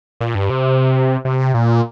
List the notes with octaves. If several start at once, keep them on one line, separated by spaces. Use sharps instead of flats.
A#2
G2
C3
C3
A#2